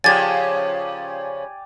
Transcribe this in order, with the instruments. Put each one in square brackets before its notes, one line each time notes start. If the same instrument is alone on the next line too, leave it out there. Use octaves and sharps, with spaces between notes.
[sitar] C#3 F3 C#4 [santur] G4 D5 G#5 [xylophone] G#6 A6